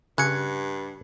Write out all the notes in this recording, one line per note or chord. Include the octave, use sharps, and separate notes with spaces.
G2 C#3 F#6 G#6 C#7